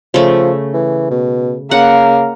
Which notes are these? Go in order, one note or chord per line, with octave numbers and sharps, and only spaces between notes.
C#3 F3 A3
E3
B2
C#3 A#3 F#5